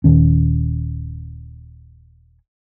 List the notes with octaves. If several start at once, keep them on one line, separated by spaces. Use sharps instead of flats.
D#1 D#3 C#4